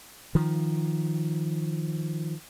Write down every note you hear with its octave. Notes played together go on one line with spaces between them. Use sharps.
D#3 F3